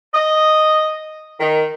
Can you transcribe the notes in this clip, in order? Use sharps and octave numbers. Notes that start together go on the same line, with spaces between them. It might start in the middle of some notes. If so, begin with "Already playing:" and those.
D#5
D#3